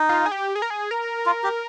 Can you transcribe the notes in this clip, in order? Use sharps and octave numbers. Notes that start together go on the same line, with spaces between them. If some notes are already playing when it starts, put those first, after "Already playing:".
Already playing: D#4
F4
G#4
G4
G#4
A#4
G#4
A#4
F4
G4